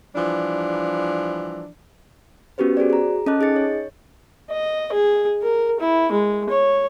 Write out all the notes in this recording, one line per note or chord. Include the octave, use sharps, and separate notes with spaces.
E3 F3 G3 D4
B3 C#4 F#4 G4 B4 C5
F#4 G#4 C5 D5
G#4 A#5
C#4 A4 D#5 A5 D6 F#6
D#4 G#4 D#5 A6 C#7
C#5
D#5
G#4
A#4
E4
G#3
C#5